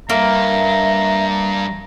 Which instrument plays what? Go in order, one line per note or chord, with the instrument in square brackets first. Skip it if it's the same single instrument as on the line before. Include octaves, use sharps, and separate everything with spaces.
[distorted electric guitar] G2 [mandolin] A#3 [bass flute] E5 [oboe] A#5